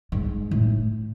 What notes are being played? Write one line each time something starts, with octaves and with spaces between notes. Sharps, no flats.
G#2
A2